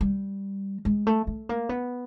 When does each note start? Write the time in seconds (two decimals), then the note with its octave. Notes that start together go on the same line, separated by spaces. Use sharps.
0.01 G3
0.85 G#3
1.07 A3
1.27 A3
1.49 A#3
1.69 B3